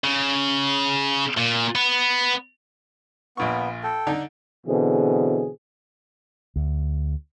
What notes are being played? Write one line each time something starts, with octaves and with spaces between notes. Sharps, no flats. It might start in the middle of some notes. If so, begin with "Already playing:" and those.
C#3
A#2
B3
A#1 A#2 B3 C#6
A4 G5
D3 D4 D#4
B2 D3 E3 C4 G#4
D2